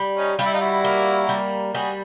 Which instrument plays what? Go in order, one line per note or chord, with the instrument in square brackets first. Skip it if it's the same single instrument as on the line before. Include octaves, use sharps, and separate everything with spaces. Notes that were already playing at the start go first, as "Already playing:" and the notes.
Already playing: [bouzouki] G3
[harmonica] C#4 D#4
[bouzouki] G3 [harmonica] F4
[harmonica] E4
D#4 F4
E4 F#4
[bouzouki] A#3
G3
[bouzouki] G3 [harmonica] F#4 G#4